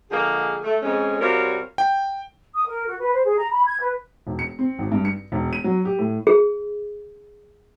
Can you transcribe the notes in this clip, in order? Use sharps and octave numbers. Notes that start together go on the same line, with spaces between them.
D3 F3 G#3 A#3 G#4
A3
F2 G#3 C#4
C3 G3 F4 F#4 A#4 C#5
G5
D#6
A#4
F#4
B4
C5
G#4
A#5
B5
G#6
B4
E1
C#7
C4
G#1
G2
C#7
E1
D#7
F#3
G4
A2
G#4